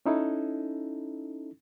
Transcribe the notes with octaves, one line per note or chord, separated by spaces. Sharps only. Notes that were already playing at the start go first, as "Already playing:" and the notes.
C#4 D#4 E4 A4